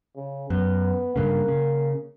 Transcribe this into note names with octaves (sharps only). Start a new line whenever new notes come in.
C#3
F#2 B3
G2 C#3 A#3
C#3